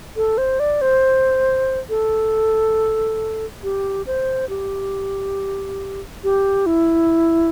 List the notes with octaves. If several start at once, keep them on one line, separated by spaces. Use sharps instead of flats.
A4
C5
D5
C5
A4
G4
C5
G4
G4
E4